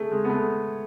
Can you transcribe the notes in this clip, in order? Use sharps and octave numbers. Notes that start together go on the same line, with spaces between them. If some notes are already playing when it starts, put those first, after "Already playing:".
Already playing: A3 G#4
G#3
B3
A3